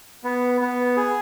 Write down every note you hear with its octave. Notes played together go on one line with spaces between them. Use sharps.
B3
B3
G#4